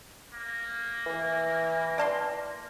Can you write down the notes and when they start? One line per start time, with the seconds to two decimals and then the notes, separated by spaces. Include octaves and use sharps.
0.33 A#3
1.06 E3
1.98 D5 A5 C6